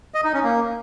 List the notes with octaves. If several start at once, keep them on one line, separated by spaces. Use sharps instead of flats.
D#5
D#4
C#4
A#3